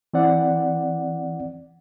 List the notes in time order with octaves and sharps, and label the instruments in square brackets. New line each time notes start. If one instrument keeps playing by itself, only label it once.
[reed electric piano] E3 C4 D5 F#5